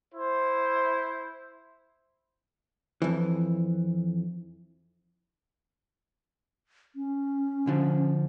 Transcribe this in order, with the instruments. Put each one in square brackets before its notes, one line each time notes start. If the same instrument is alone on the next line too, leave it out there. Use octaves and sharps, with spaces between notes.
[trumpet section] E4 C5
[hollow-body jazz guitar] F2 E3
[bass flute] C#4
[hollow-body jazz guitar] D3 F3